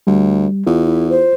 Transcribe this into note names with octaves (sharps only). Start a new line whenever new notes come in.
D2 G3
E2 F4
E4
C5